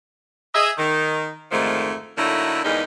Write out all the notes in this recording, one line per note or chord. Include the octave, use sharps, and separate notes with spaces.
G#4 D#5 E5
D#3
F2 G#2 D3 D#3 F3 A3
D3 F#3 A3 A#3 D#4 E4
E2 D3 G3 G#3 A#3 D#4